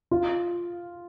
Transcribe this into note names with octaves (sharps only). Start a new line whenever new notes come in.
F4